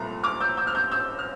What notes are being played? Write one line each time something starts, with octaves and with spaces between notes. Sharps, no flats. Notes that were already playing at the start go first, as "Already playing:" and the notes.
Already playing: C2 A#2 A3 A#5
D6 F6
E6 G6
E6 G6
F6
E6 G6
E6 G6
F6